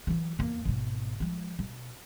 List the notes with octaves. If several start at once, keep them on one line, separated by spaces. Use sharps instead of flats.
E3 F#3
E2 A#3
G#1 B2
F3 G#3
B2